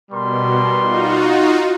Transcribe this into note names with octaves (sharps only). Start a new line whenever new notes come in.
B2 G3 A#4 C6
D#4 F4 F#4